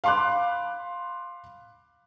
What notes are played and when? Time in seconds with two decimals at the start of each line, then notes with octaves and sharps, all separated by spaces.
0.04 F5 B5 C6 D6 F#6